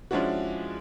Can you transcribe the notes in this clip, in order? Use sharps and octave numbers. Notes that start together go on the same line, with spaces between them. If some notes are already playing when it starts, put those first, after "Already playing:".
F3 G#3 C#4 D4 E4 F#4